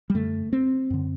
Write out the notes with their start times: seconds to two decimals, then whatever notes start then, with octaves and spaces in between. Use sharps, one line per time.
0.10 G3
0.14 F#2 D3 A3
0.53 C4
0.90 F#2 D3